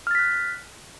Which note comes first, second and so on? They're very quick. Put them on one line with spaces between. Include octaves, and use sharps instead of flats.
F6 A6 B6 F#6